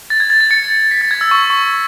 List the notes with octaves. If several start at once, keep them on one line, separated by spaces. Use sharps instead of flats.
A6
G#6
A6
A6
A6 C#7
B6
A6
G#6
E6
C#6
C#6